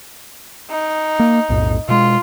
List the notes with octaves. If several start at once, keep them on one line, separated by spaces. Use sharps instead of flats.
D#4
A#3
B1 F2 A2
B2 G#3 F4